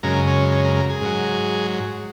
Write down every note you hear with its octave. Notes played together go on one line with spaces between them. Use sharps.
F#2 C#3 G#3 A#4
C#4
C#4
A#4
A#4
G#4
G#2 F#3